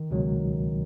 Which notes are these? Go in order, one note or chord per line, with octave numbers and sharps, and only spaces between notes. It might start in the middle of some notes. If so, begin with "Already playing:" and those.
Already playing: D#3
C#2 B2 F#3